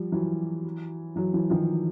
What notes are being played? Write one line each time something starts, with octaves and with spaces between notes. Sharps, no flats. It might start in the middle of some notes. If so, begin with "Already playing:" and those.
Already playing: F3 G3
E3 F#3
E3 F#3
E3 F#3
D#3 F3